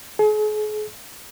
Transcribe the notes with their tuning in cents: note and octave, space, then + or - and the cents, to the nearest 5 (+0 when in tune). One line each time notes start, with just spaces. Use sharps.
G#4 +40